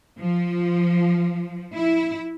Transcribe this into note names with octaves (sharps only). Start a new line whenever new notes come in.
F3
E4